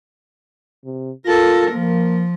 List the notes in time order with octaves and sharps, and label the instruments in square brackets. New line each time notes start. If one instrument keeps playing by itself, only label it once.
[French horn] C3
[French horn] F4 [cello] A4 A#4
[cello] F3 [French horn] A#3